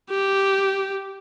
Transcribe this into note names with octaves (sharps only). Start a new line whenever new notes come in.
G4